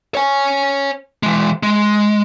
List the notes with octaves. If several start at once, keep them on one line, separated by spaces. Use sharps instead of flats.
C#5 G#5
E3 G#3
G#3